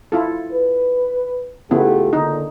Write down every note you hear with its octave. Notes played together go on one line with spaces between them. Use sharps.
E4 F4 A4
B4
C#3 A3 B3 E4 F4 G4
A#2 D3 D#4